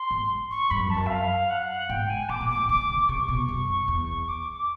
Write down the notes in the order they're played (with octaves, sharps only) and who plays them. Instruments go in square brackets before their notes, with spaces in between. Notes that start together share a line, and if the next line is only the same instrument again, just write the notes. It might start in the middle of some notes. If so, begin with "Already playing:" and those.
Already playing: [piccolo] C6
[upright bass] G#2
[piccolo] C#6
[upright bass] G2 [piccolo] B5
[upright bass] F#2
[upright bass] F2 [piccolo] A5
[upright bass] F#2
[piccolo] E5
F5
F#5
[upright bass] G#2 [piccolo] G5
[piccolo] G#5
[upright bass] A2 [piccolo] D6
[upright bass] A#2
[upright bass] A2 [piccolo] D6
[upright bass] D3 [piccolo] D6
[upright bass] C#3
[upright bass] C3 [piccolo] C#6
[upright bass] B2
F#2
E2
[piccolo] D6